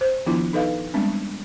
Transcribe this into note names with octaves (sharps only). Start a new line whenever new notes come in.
C5
D#3 F3 B3 D4 E4 F4
D#4 A4 B4 D#5 F5
G3 G#3 B3 C4 D4